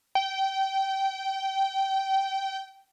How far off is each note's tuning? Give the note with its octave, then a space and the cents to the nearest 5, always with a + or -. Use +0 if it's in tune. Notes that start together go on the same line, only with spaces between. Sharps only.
G5 -20